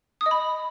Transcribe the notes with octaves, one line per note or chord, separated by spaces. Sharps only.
D#6
D#5
B5